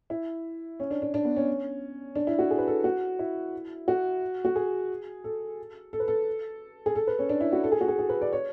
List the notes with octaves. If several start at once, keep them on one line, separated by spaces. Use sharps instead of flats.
E4
C#4
D4
D4
D4
B3
C#4
D4
E4
F#4
G#4
B4
A4
F#4
E4
F#4
F#4
G#4
A4
A4
B4
A4
G#4
A4
B4
C#4
D4
E4
F#4
A4
G#4
F#4
G#4
G#4
B4
D5
C#5